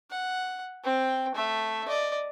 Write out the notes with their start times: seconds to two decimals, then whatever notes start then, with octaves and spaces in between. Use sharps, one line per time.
0.10 F#5
0.84 C4 G5
1.35 A3 E5
1.88 D5 D#5